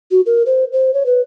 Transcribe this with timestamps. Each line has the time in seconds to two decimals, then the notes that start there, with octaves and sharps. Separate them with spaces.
0.11 F#4
0.26 A#4
0.46 C5
0.73 C5
0.94 C#5
1.06 B4